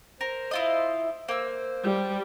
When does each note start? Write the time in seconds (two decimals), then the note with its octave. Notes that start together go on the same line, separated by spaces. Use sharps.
0.21 A#4 C5
0.51 E4 F4 D#5
1.28 A#3 C5 E6
1.84 G3